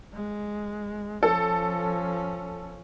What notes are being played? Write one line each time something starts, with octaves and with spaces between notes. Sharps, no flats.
G#3
F3 C#4 A4